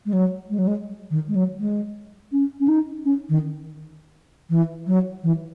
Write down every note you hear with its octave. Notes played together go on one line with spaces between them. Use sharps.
G#3
F#3
G#3
F#3
G#3
D#3
G#3
F#3
G#3
C#4
C#4
D#4
C#4
D#3
E3
F#3
E3